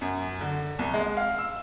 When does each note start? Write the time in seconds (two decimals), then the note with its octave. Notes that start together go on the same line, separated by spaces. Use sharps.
0.01 F#2
0.41 D3
0.79 C2
0.94 G#3
1.17 F5
1.39 E6